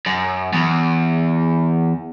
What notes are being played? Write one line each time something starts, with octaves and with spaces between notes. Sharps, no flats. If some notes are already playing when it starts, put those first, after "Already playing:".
F#2
E2